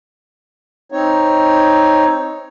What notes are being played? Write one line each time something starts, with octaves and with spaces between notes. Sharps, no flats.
C4 D#4 C#5